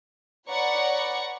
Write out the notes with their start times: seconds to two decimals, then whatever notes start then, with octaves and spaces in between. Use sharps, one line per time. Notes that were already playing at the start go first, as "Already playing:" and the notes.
0.49 B4 C#5 D5 F#5 A#5 C#6